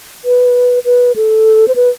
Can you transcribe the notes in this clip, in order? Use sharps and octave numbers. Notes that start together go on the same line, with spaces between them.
B4
B4
A4
C5
B4